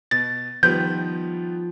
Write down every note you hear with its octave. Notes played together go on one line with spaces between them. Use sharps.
B2 A6
D#3 F3 G3 B3 G6